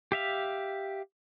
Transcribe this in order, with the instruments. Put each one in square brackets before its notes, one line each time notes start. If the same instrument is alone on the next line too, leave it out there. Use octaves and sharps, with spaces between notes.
[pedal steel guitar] G4 E5 F5